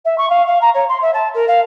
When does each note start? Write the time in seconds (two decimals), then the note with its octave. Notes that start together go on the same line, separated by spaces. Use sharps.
0.05 E5
0.18 C#6
0.29 F5
0.46 F5
0.61 A#5
0.74 C#5
0.89 C6
1.01 E5
1.13 A5
1.34 A#4
1.47 F5